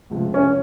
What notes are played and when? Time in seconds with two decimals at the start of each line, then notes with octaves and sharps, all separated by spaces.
0.10 C#2 C3 F3 G#3
0.34 C#4